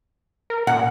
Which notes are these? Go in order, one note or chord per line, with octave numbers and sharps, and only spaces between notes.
A#4
A#2 F#5